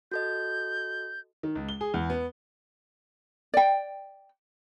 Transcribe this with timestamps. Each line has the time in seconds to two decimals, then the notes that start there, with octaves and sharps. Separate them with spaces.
0.11 F#4 A4 D#5 G6
1.43 D#3
1.55 C#2
1.69 G7
1.81 G#4
1.94 E2
2.10 B3
3.54 D5 G5